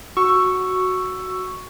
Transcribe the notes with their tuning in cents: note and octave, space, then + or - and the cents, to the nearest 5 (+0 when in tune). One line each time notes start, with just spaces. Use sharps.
F#4 +0 C#6 +0 E6 +10